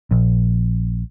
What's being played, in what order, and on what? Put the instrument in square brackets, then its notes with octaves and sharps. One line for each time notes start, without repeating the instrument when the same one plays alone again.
[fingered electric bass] A#1